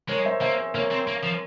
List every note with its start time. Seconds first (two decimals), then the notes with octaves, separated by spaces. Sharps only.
0.09 G#3 A#4 C#5
0.19 C#5
0.25 C5 E5
0.41 A#3 C5 E5
0.58 G#4 C5
0.74 A#3 A#4 C#5
0.91 C4
1.07 A#3
1.23 F3